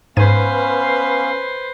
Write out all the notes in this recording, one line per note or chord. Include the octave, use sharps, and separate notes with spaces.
G#2 B3 C#4 B4 C5 F5 G#6 D#7